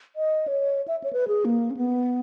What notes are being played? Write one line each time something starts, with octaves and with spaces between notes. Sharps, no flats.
D#5
C#5
E5
C#5
B4
G#4
A#3
C#4
B3